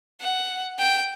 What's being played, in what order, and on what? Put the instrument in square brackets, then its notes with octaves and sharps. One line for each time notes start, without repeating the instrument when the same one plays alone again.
[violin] F#5
G5